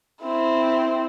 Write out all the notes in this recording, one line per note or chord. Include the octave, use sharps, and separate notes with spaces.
C4 E4